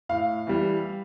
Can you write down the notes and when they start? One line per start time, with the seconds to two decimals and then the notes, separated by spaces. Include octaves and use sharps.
0.09 A2 F5
0.47 E3 G3